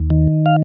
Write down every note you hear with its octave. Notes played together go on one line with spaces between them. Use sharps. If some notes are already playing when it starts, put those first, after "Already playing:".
Already playing: D#2
D#3
F5